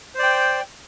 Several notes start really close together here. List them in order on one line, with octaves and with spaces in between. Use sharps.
C5 D5 G5